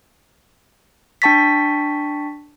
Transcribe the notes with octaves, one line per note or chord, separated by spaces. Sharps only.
D4 G5 A5 C#6 A6 B6